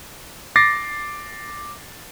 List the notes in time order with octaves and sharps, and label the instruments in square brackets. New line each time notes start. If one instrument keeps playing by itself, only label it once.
[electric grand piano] D6 A6 A#6 C7